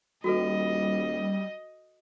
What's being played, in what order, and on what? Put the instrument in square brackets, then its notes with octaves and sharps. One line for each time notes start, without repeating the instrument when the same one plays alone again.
[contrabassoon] D#1 [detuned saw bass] G3 [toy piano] F#4 A4 B4 [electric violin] D#5